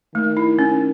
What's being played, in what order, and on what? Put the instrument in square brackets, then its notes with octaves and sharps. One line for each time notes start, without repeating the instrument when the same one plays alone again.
[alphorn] D#3 [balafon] A3
[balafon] E4
C#4